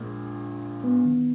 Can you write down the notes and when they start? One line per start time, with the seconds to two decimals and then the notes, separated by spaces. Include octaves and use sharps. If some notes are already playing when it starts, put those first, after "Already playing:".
Already playing: A#1 A#2 G#3
0.84 B3
1.05 D#3